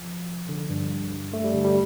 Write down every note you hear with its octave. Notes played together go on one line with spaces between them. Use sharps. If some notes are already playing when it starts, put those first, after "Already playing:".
Already playing: F3
D3
G2
A3
G3
D3
G3